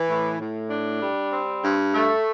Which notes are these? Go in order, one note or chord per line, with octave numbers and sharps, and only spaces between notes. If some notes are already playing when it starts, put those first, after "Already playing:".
Already playing: E3
A2
A2
D4
G3
C4
G2
A3